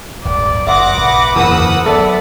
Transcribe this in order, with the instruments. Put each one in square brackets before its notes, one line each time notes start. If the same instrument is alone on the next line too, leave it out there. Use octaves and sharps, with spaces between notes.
[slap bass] D1 G1 [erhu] D5
[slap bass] F#1 [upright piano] E5 C6 D#6 [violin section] F#5 D6 A#6
[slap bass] A#1 [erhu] B4
[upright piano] F#1 [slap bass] E2 A#2 D3 [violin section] F#5 D#6 E6
[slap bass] F#3 [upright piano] B3 A4 [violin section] D5 [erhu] E5